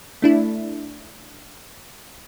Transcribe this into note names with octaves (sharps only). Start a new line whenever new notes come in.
A3 D4 E4